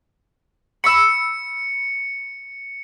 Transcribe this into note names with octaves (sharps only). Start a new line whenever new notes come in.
B5 C#6 E6 C#7